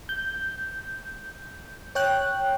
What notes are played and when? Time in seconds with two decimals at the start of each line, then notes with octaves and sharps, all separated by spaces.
0.09 G6
1.95 C#5 G5 F#6